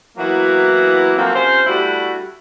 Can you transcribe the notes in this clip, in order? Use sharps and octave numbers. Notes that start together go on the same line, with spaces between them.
E3 F#3 A#3 B3 E4 F#4
F3 F#3 A3 A#3 C4
C3 C#4 F4 C5
G3 A3 D4 E4 F#4